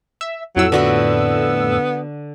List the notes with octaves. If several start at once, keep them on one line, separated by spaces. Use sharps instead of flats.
E5
F2 A2 F#3 E6
D3 B3 F#4 B4